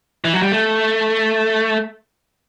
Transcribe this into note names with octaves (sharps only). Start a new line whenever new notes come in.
E3
F#3
G3
A3